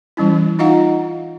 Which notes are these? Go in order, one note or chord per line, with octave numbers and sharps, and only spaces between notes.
E3 G3 C#4 E4
D#4 F4 D#5 F5 F#5 A#5